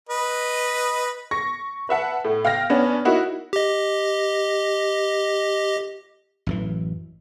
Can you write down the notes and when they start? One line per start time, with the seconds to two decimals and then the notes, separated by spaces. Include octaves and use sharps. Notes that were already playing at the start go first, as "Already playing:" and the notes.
0.09 B4 D#5
1.31 C#6 A#6
1.89 B4 E5 F#5 A5
2.24 A2
2.45 F5 G5 F6 A#6
2.70 B3 C#4 D4
3.05 A#3 D#4 E4 F#4
3.53 G4 D#5
6.47 A1 F#2 E3